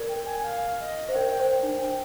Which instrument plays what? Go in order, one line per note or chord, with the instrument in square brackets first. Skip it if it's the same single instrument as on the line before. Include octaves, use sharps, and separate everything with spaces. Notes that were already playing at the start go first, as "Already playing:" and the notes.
Already playing: [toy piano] A#4 D5
[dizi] G5
G#5
F5
D#5
[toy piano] C5
[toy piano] A#4 D5 [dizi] G5
[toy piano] C5
[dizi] G5
[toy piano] D4